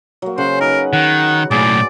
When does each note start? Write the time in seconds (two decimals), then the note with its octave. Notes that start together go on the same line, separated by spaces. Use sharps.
0.22 F#3 A#3
0.38 C#3 C5 F#5
0.61 D#4 A#4 B4
0.93 D#3 F#5
1.51 B1 A2 G#4 D5